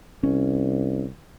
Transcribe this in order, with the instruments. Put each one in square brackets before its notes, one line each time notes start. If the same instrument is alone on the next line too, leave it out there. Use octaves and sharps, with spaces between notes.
[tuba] C2 [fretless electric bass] C#4